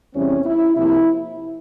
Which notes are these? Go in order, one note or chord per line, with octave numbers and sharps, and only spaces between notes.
E2 C3 E3 G3 C4 C#4
E4
C3 F3 A#3 E4